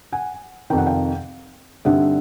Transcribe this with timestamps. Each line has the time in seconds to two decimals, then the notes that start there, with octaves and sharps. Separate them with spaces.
0.12 F#5 G#5
0.70 F2 C3 D#3 G5
0.78 F#5
0.86 F5 G5
1.85 G2 D3 G3 C4 D#4 E5 F#5